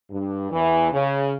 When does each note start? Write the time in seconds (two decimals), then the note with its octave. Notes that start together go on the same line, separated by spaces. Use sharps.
0.11 G2
0.51 E2 E3
0.92 C#3